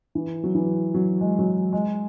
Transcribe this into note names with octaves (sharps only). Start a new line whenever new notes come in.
E3
F#3
E3
F#3
G#3
F#3
G#3
G#3